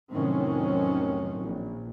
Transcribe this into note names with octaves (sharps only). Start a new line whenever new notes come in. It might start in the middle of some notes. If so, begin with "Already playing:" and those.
F1 A2 D#3 F#3 C4 C#4
A#1